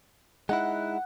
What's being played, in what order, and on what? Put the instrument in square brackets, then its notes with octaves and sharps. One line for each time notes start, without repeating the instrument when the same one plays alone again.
[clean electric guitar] G#3 D#4 E4 [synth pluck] F#5